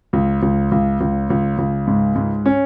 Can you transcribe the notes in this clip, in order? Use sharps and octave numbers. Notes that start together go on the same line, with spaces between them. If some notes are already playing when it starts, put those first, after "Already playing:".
C#2
C#2
C#2
C#2
C#2
C#2
G#2
G#2
C#4